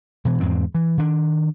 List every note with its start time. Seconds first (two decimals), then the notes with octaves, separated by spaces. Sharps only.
0.25 B2 E3
0.40 E2 G#2 G#3 C4
0.75 E3
0.98 D#3 D4